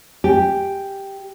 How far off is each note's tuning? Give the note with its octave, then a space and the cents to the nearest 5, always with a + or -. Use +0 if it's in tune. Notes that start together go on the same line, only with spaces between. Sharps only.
G4 +0 G#5 +0